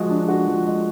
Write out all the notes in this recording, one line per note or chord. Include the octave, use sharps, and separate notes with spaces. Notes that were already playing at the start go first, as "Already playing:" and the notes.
Already playing: F3 G#3 F#4
D4
F#4
F3
G#3